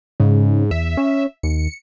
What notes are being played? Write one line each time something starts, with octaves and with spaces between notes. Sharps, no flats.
G#2 C#3
E2 E5
C#4
D#2 C#7